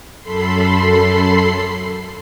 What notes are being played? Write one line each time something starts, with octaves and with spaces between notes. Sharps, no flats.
F#2 A4 B5 C6 C7